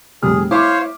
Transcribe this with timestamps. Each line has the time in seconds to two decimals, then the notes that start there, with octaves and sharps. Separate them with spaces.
0.23 F1 G3 G#4 F6
0.51 E4 C5 C#5 F5 D6